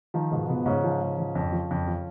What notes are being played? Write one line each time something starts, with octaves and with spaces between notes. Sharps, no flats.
D#3 F3 D#4
G#2 B2 B3
B2 F3 B3
G#2 C#3 C#4
F3
G#2
F3
F2
F3
F2
F3